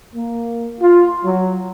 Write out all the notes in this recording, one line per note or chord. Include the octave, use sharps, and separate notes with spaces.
A#3
F4
F#3